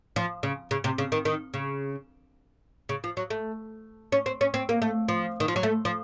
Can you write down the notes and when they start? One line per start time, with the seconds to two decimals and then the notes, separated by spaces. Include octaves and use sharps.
0.16 F3
0.43 C#3
0.71 C#3
0.84 C3
0.98 C#3
1.12 D#3
1.25 D#3
1.54 C#3
2.89 C#3
3.04 F3
3.17 F#3
3.30 A3
4.12 C#4
4.26 C4
4.41 C#4
4.54 C4
4.69 A#3
4.82 A3
5.08 F3
5.40 D#3
5.48 F3
5.56 F#3
5.63 A3
5.85 F3